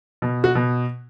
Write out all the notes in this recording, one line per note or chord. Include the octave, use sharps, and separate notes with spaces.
B2
F#4
B2